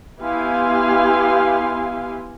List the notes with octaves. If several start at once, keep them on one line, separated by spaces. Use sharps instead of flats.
B3 E4 G4 F5 G#5 C6